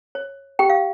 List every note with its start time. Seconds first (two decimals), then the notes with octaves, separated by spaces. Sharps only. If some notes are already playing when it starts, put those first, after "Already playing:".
0.15 C#5
0.59 G4 G5
0.70 F5